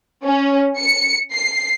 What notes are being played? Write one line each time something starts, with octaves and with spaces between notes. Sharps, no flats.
C#4
C#7
C7